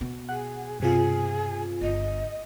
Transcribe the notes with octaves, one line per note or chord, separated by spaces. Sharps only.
B2
G#4 F#5
G2 C3 F4 G#4
G1 D#5